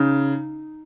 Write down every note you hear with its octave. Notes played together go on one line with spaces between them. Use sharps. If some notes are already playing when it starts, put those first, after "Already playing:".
Already playing: C#3 D#4